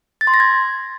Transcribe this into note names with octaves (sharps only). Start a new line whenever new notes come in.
A6
C6
A#6
G#6